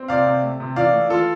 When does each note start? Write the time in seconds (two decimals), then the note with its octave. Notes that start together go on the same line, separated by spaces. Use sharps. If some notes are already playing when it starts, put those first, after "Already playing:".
Already playing: C4
0.08 C3 D5 F5
0.26 C3
0.43 A3
0.60 C3
0.76 E3 D5 F5
0.93 A3
1.10 E3 F4 A4